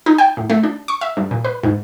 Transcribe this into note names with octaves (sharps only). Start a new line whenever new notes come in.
D#4
G5
A2
A3
D4
C#6
E5
G2
A#2
B4
G#2